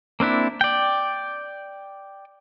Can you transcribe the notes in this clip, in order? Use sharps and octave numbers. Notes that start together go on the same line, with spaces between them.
A#3 C4 D4 E4
D5 G5